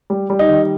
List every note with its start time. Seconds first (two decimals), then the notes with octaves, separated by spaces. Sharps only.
0.10 G3
0.30 G3
0.39 D#4
0.49 D#3